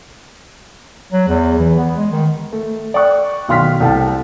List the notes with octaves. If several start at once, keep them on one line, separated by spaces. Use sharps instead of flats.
F#3
E2
E3
B3
G#3
D#3
A3
D5 G5 C#6 F#6
B1 D#3 F5 C6 F6 B6
C2 A4 G5 A5